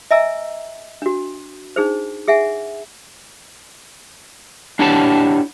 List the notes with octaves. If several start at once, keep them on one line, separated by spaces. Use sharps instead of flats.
D#5 E5 G#5 A#5 E6
D4 F#4
D4 D#4 G#4 C5
G#4 E5 F#5 G#5
D4 E4 G4 C#5 F#5 A5